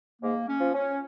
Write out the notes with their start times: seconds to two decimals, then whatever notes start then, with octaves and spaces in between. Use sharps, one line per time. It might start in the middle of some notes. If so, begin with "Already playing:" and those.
0.22 G#2 A#3
0.48 C#4
0.60 F3
0.74 C#4